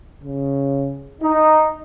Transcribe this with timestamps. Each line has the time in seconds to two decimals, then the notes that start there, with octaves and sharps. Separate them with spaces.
0.22 C#3
1.22 D#4